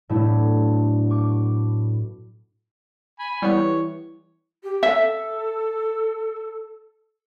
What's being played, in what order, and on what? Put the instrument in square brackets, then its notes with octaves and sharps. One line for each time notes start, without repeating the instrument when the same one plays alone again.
[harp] A2 F#3 A3 B3 D4 E4
C#6 D6
[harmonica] G#5 B5
[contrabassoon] E3 [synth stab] G3 B3 [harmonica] C#5
[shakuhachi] G4
[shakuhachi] A4 [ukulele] E5